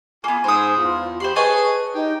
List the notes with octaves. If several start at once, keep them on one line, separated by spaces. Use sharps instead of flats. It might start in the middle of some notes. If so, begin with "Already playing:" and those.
A#3 B3 F4 G#5
G#2 C5 D#6
E2 F4
G4 C5 B5 C6
G#4 B4 C#5 D#5 A5
D#4 G4